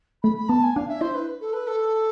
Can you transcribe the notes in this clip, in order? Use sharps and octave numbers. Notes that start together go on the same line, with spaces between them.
A3 B5
B5
B3 A5
G#5
D4 F5
E5
E4 C5
B4
A4
B4
A4